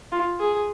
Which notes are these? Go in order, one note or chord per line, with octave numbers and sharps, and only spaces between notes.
F4
G#4